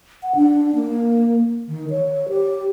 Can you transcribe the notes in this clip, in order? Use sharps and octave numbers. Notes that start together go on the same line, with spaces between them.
F#5
D4
A#3
D#3
C#5
G4